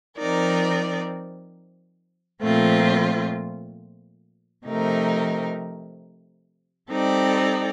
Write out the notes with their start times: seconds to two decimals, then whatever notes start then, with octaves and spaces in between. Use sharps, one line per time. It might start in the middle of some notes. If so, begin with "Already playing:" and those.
0.18 F3 C4 D#4 A#4 D5
2.42 A#2 F3 A3 C4 F4
4.66 C3 F3 A3 D#4 A#4
6.90 G3 C4 D#4 A4 D5